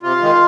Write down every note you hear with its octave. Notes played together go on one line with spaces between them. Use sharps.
C3 F4
D#3 G#3